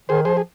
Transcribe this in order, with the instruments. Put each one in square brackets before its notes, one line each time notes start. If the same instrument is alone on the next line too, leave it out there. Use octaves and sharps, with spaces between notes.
[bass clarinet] D#3 [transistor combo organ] G#4 C5
[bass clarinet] F3 [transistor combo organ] G#4 C5
[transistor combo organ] G#4